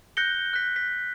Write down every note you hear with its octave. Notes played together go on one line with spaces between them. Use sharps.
F#6 G6 A#6 C#7 G7
F#6 B6
B6